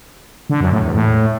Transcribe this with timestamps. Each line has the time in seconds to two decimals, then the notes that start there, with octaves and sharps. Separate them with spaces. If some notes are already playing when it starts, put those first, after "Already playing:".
0.50 D3
0.61 F#2
0.72 A2
0.83 E2
0.94 A2